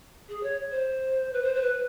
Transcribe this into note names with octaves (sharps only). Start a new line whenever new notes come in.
G#4
C#5
C5
B4
C5
C5
B4